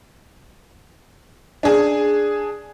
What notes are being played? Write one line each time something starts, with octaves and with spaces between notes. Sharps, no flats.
D4 G#4